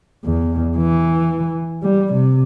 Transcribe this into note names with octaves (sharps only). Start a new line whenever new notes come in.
E2
E3
G3
C3